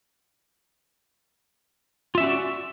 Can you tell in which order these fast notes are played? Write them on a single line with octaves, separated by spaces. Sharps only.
F4 E5 C#4 F#4 D5